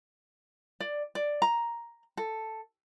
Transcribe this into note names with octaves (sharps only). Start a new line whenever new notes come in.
D5
D5
A#5
A4